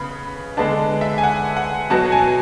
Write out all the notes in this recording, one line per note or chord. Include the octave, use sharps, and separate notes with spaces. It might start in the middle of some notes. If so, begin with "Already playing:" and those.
Already playing: C#3 B3 B5
D3 G#3 B3 D4 A5
E5
G#5
F#5
F#5
B2 F#3 B3 A5
G#5